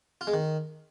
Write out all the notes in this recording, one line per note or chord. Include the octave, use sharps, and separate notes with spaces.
F4
G#3
D#3